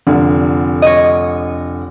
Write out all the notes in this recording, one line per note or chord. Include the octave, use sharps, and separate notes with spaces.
F1 D3
C#5 D#5